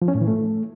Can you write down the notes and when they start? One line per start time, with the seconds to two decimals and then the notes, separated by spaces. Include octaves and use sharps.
0.02 F3
0.08 C#4
0.15 A2
0.21 E3
0.28 A3